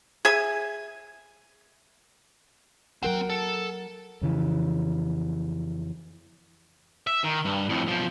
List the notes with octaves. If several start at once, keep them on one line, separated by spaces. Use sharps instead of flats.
G#4 E5 G#5
F#3 C4 A#4 F#5 G5
A4
F2 C#3 E3
E5
D#3
G2
F2 A2
B1 F3